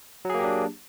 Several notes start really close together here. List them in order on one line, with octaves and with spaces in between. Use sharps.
F#3 G#4 A#3 G4 D4